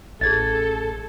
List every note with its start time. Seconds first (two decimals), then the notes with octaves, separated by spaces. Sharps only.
0.21 A1 G#4 A4 G#6 A6